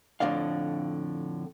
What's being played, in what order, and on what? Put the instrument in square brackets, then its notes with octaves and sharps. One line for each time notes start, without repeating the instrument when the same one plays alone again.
[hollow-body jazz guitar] F2 A2 D3 D5 F5